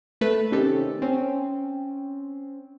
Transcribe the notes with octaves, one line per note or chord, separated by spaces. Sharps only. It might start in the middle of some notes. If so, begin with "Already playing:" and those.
A3 B4
C3 D#3 C4 C#4 G4 A4
C4 C#4